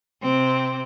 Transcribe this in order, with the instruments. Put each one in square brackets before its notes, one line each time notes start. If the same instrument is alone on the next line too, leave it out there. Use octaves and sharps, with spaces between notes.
[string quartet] C3 C4